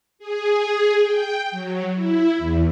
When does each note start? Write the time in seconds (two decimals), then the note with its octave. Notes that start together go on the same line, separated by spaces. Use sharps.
0.19 G#4
1.00 G5
1.51 F#3
1.94 E4
2.38 E2